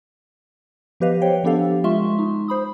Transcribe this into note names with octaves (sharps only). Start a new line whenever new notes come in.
F3 B3 G4 B4 D#5 F5
C5 C#5 G5
F3 B3 D4 G4 A4 F5
G#3 F4 E5 C6 C#6
D#4
C5 B5 D#6